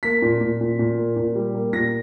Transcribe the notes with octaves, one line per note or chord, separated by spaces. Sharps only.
A#3 B6
A#2
A#2
A#2
A#2
A#3
A#2
G3
A#3
A#2 A#6